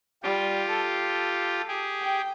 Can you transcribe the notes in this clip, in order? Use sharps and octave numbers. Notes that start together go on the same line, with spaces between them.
G3 F4 G4
A4
G4 G#4
G5